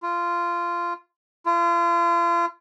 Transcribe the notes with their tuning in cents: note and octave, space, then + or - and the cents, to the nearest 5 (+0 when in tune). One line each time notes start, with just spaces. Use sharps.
F4 -15
F4 -35